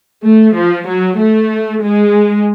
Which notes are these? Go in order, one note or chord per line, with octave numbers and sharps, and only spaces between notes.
A3
F3
F#3
A3
G#3